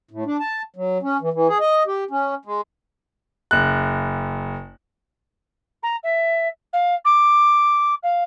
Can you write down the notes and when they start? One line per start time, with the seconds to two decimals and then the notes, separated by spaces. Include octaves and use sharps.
0.11 A2
0.26 D4
0.40 A5
0.76 F#3
1.03 C#4
1.21 E3
1.33 E3
1.48 G#4
1.60 D#5
1.87 G4
2.11 C#4
2.45 G#3
3.51 F#1 F#6
5.83 A#5
6.03 E5
6.73 F5
7.05 D6
8.03 F5